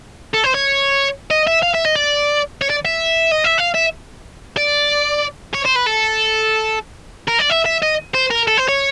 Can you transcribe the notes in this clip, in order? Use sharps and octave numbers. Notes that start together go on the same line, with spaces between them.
A4
C5
C#5
D#5
E5
F5
E5
D#5
D5
C#5
D5
E5
D#5
E5
F5
E5
D5
C#5
C5
B4
A4
A#4
D5
E5
E5
D#5
C5
A#4
A4
C5
C#5